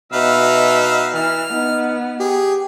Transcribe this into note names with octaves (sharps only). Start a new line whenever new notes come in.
B2 D#4 B4 E5 F5
E3 F6
B3 D#4
G4 G#4